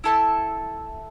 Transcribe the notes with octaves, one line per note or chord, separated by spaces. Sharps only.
E4 A4 E5 A5